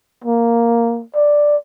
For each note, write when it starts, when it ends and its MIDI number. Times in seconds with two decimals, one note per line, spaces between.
0.24 1.03 58
1.16 1.56 74